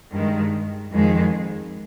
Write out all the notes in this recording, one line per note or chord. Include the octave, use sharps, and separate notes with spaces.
G2 D#3 G#3
F2 D#3 G#3